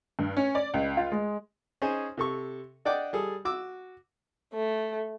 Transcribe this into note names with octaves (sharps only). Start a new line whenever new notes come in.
G2
C#4
D5
C#2
F4
G#3
C#4 D#4 G#4 C5 G#5
C3 A4 C#6
D4 D5 D#5 F#5 G5 D6
G3 G#4 A4
F#4 D6 E6
A3